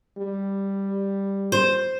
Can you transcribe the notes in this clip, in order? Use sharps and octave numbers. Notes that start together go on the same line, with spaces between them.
G3
C5